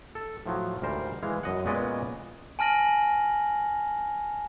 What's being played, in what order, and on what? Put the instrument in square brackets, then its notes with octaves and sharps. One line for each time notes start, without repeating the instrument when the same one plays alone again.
[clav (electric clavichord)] A4
A2 F3 F#3
D2 G#2 G3 A#4 C5
E3 G#3 F5
F#2 D#5 F#5
A#2 G#3 B3 C#4 D5 D#5
[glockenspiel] G#5 A5 F6 A#6 F#7